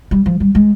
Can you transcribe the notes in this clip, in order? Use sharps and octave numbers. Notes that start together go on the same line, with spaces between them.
G3
F3
G3
G#3